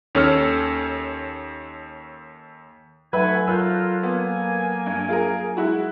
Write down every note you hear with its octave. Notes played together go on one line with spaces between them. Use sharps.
D#2 C#4 A4 C#5 F6
F#3 A3 D#4 B4 E5 F#5 G#5 B5
F4 A4 A#4 C#5 E6 F#6 G6
A#3 B3 G#5
G2
F4 G#4 A#4
G#3 E4 F#4